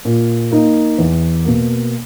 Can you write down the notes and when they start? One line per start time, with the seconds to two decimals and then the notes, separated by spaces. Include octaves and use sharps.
0.05 A#2
0.52 A#3 D#4
0.98 E2
1.45 B2 A#3